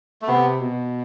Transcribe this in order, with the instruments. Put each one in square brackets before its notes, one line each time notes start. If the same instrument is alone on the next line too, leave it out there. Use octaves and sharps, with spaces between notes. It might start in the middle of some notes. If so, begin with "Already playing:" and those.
[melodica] A3
[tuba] C3 [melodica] B3
[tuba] B2